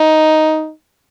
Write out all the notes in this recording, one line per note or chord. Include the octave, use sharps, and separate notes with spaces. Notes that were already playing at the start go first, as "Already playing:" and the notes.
Already playing: D#4